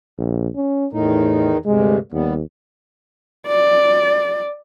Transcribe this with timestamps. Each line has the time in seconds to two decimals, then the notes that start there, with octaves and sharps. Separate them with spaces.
0.18 A#1
0.56 C#4
0.93 E2 A2 D#3 D#4
1.66 D2 G2 C3 G#3
2.12 D#2 G3 B3
3.48 D5